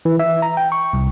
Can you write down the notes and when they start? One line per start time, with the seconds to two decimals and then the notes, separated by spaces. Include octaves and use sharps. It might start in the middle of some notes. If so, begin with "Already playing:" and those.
0.05 E3
0.19 E5
0.42 A#5
0.57 G5
0.72 C#6
0.93 C2